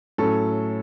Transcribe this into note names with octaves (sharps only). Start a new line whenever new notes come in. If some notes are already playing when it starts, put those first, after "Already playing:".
A2 F#3 C#4 A4